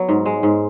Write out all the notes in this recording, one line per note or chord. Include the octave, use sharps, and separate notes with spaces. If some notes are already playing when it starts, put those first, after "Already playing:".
Already playing: F#3 B3
G#2
G#3
G#2